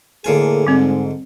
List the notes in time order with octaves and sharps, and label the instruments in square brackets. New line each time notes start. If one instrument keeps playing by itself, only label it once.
[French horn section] A2 A#3 G#4 [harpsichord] D3 F4 G#5
[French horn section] G#2 [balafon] G3 C4